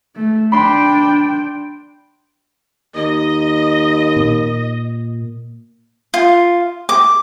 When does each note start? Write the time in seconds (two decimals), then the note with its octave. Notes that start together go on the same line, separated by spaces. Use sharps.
0.16 A3
0.52 D4 G5 B5 C6 E7
2.95 D#2 D#5
4.16 A#2
6.14 F4
6.89 D6